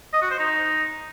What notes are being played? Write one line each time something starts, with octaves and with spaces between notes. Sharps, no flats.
D#5
F#4
C5
D#4